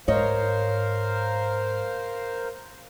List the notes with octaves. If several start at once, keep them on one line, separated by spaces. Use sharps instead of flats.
G#2 A#4 C5 C#5 D#5 F5